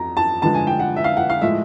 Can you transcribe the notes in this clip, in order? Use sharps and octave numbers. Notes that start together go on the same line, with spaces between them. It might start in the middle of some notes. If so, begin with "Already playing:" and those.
Already playing: F2 F#3 A#5
A5
G2 D3 F3 G#3 A5
G#5
G5
F#5
E5
F5
F#5
F5
A2 F3 G#3 E5